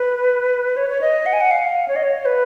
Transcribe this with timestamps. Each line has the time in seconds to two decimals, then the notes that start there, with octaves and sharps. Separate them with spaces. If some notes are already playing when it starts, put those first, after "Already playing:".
Already playing: B4
0.77 C#5
0.90 C#5
1.01 D#5
1.26 F#5
1.33 G#5
1.41 F#5
1.51 F5
1.88 C#5
1.96 D#5
2.03 C#5
2.25 B4